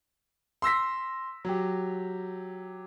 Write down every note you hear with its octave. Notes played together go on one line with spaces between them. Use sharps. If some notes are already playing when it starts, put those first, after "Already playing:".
C6 E6 A#6 B6
F#3 G4